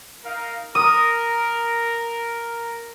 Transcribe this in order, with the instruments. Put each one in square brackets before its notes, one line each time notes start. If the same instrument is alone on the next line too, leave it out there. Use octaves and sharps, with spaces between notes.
[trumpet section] D#4 A#4 F5
[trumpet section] A#4 [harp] D#6